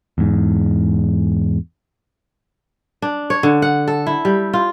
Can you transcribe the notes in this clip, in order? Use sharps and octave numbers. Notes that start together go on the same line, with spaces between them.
E2 G#2
D4
C#5
D3
F#5
A4
E4
G3
F4